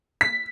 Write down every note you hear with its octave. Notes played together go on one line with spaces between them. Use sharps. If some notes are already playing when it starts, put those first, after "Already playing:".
B6